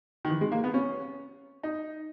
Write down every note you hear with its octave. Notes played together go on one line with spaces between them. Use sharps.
D#3
E3
G#3
A#3
B3
C#4
D#4